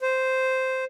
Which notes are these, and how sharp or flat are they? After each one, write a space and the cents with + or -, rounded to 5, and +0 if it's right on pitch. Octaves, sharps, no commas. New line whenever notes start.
C5 -5